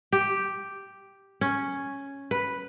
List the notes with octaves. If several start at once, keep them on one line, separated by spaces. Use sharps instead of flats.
G4
C#4
B4